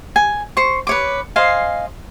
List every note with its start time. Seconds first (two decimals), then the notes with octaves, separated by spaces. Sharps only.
0.16 G#5
0.57 C5 C#6
0.87 B4 C#5 D6
1.36 C5 D#5 F5 G#5